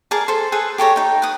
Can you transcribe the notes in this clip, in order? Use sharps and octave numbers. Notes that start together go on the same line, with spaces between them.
G#4 A#4 D5 A5
A4 C5
G#4 A4 B4 C5
G4 A4 C#5 A#5
D#4 G5
B4 D#6